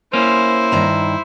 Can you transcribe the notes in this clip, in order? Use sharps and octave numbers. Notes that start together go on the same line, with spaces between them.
A#3 C#4 E4 C5
G2 D#3 A#5